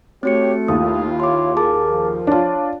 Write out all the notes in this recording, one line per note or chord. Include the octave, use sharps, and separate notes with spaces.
A3 C4 F#4 G4 C#5 C#7
D#2 E4 F4 D#6
C#5 C6 D6
G#4 A#4 A5 D6
F3
D4 F4 C#5 A5